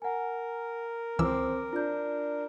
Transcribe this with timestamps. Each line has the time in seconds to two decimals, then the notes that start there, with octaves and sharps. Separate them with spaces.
0.02 A#4 F#5 G#5
1.19 C#2 E3 C4 D6 E6
1.73 D4 F4 G6